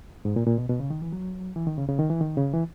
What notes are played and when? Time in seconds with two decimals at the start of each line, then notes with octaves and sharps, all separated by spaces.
0.25 G#2
0.36 A#2
0.47 A#2
0.58 B2
0.69 B2
0.80 C#3
0.90 D#3
1.02 E3
1.12 F#3
1.56 E3
1.67 D#3
1.78 C#3
1.89 C#3
1.99 D#3
2.10 E3
2.21 D#3
2.37 C#3
2.53 E3